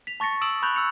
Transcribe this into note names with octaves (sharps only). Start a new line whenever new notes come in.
B6 F7
A5 C#6 A6 A#6 C#7
D#6 E6 D7 E7 F#7
B5 C#6 F#6 G6 F7 F#7
E6 C#7 F7